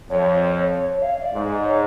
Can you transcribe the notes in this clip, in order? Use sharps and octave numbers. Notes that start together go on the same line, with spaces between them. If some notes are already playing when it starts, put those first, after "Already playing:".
F2 C#5
C#5
F5
F5
D5
G#2
C#5